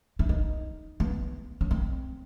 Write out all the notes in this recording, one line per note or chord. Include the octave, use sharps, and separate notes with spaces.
E4
D#4
B3
C#4
C4